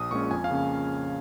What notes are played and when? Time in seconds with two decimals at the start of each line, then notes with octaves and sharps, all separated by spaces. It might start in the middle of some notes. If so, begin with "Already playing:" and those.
Already playing: A#1 D#6
0.11 A#2 G#3 C#4 C#6
0.31 F2 G#5
0.44 F5
0.51 C#3 A#3 C#4